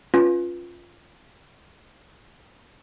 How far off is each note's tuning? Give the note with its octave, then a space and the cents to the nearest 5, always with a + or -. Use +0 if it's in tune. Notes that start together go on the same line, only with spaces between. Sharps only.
C#4 -5 F4 +0 B4 +0